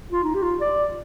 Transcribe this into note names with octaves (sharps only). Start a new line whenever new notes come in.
F4
D#4
G4
F4
D5